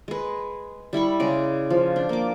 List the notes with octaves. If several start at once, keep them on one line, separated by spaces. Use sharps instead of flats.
G#3 B4
G3 E4 B5 C#6
C#3 G#3 D5
F3
D4
A#3 D6